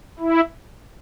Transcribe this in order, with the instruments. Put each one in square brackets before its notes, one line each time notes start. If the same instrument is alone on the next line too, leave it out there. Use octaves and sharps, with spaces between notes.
[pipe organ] E4